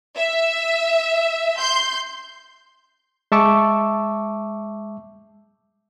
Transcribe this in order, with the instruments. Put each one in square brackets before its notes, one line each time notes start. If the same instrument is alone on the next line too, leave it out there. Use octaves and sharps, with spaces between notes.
[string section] E5
C6 G6
[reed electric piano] G#3 E5 A5 C#6 D6 E6